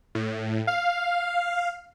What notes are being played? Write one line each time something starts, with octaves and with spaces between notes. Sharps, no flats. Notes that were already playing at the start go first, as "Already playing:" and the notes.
A2
F5